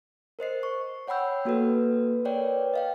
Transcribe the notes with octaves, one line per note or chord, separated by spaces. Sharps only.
A#4 C5 D#5 C7
C#6
C#5 F#5 G5 B5 E6 G6
A#3 F#4 A4 B4
A#4 B4 C#5 D5 G5
D#5 F5 G5